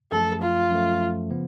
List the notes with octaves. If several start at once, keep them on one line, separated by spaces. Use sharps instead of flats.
F#2 F3 A3 A4
F4
F#2 F3 A3
C#3 F3 B3